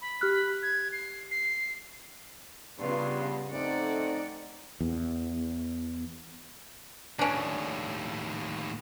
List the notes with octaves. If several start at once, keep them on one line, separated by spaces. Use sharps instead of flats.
B5
G4 F6 F#6
G#6
C7
C7
G2 C#3 B3 F4
A3 C4 D#4 D5 F#5
E2
D#2 A2 C#4 D4